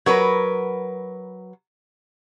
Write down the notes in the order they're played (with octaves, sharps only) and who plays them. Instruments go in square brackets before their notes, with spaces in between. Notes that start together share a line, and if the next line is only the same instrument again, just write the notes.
[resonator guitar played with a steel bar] F#3 A#4 B4